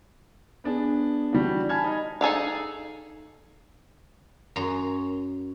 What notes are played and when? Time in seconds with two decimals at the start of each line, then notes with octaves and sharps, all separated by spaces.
0.64 B3 D4 G#4
1.33 E3 G3 D4 F#4
1.69 G#5 A5 B5 F6 G#6
1.84 D#4 D#5
2.21 D#4 G#4 A4 F5
4.56 F#2 A#5 C6